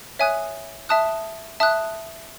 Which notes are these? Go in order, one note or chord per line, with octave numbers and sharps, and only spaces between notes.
C#5 E5 G#5 D#6 F#6
E5 A5 D#6 F#6
E5 A5 D#6 F#6